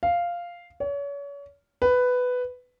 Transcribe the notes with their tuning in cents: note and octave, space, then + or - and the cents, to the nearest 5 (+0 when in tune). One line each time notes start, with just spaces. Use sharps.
F5 -5
C#5 +35
B4 +10